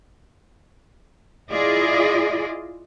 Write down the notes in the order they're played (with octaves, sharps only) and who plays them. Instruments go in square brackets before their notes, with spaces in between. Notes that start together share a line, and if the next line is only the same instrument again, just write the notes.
[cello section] E4 F4 G#4 D5 D#5